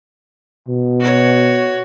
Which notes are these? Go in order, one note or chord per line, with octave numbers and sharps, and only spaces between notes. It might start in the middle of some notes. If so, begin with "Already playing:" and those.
B2
F#4 C#5